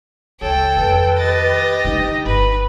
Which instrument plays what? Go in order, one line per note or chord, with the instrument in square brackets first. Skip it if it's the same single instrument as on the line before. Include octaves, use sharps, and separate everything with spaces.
[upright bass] C#2 [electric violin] A4 [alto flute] C#5 [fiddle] G5
[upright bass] F2 D#3 [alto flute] B4
[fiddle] G4 D#5 [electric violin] A6
[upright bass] D3 [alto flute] D#4
[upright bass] G1 [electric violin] B4